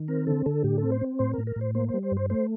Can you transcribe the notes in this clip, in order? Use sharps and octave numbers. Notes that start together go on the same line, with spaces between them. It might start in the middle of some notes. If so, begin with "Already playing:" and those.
Already playing: D#3
C4 A#4
D3 A4
D3 A4
A2 G4
C4 A4
C5
C4
A2 C5
A#4
A2
A#4
A2
C5
A#3 C5
C5
G3
C5
G2
C5
A3 C5